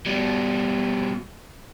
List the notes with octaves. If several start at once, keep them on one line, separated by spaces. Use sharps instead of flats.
B2 G3